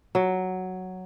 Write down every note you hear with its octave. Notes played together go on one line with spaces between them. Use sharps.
F#3